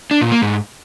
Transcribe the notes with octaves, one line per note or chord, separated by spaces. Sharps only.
D4
A#2
A#3
G#2